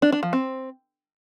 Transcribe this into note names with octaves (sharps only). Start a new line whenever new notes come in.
D4
D4
F3
C4